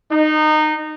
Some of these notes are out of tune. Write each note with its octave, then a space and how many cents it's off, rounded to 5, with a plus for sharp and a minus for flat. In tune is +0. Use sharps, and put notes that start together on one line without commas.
D#4 -20